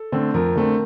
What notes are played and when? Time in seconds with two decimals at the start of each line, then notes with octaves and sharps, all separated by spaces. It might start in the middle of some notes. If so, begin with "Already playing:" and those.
Already playing: A4
0.12 D3 A3 C4
0.34 F2 A#4
0.56 D3 A3 C4